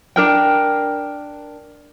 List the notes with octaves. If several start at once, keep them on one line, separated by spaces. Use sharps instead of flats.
D4 A#4 G5